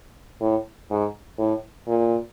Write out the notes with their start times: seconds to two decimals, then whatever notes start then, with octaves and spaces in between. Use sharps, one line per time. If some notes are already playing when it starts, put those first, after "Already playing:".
0.41 A2
0.90 G#2
1.38 A2
1.87 A#2